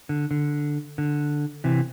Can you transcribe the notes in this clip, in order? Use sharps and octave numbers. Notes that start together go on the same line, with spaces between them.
D3
D3
D3
C3 E3